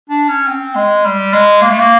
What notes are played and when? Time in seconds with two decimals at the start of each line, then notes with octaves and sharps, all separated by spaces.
0.09 D4
0.28 C#4
0.47 C4
0.75 G#3
1.05 G3
1.33 G#3
1.62 A#3
1.70 A3
1.80 A#3